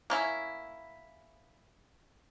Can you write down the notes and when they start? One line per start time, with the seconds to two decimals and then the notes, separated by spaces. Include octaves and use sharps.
0.10 A#3 C#4 E4